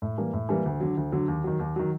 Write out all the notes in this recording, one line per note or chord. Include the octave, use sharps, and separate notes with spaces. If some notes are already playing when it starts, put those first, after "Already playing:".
A2
E3 G3 A#3
A2
E3 G3 A#3
D2
D3 F#3
D2
D3 F#3
D#2
D#3 F#3
D#2
D#3 F#3